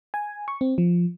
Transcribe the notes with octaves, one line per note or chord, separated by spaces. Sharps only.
G#5
C#6
C4
F3